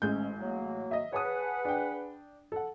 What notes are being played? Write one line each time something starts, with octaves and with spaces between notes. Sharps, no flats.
A1 G#2 G#3 C#4 G6
F#3 A#3
D#5 E5
G#4 B4 C#5 F#5 A5 D#6
D4 G5
A4 F#5